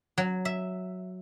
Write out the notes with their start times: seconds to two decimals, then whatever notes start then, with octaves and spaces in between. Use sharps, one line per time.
0.18 F#3
0.45 E5